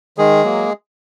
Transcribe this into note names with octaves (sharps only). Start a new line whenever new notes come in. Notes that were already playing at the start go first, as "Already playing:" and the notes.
D#3 G#3 G#4
F#3 A#3